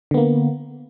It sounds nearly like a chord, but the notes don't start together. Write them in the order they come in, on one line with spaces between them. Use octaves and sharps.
D3 B3 A#3